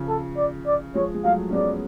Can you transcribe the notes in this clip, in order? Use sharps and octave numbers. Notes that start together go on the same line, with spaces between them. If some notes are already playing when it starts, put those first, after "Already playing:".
Already playing: C#3 F3
A4
D5
D5
F3 G#3 C#5
G#3
F#3 A3 F5
C#4
G#3 B3 D5